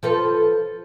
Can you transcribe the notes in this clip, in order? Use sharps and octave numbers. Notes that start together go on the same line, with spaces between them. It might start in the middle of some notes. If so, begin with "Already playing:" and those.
F3 A4 B4